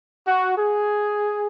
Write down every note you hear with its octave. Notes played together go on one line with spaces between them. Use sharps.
F#4
G#4